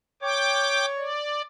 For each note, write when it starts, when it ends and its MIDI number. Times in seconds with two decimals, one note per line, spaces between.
0.22 1.08 73
0.22 0.86 79
0.22 0.86 86
0.98 1.42 74